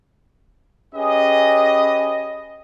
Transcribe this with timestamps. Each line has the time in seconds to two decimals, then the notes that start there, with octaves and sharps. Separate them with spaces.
0.95 C#4 G4 G#4 B4 D#5